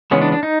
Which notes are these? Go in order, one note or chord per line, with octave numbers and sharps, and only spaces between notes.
C#3 E3 G#3 B3 C#4
D4
D4
D#4